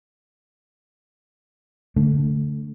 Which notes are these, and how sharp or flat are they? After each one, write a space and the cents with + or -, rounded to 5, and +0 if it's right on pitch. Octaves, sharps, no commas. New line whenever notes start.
D3 -25 A3 +0